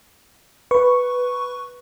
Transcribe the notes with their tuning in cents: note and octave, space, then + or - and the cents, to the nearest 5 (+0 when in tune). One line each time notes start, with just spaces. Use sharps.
B4 +0 C#6 +0